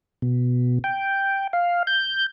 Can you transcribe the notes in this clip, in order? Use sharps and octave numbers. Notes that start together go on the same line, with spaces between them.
B2
G5
F5
G6